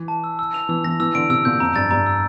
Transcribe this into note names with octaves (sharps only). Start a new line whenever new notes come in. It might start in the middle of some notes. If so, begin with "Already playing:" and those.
Already playing: E3
A5
E6
E6
F7
E3 E6
E3 A#6
E3 E6
D3 D7
C3 E6
A#2 G6
F2 A#5
G2 A6
G2 A#5
E6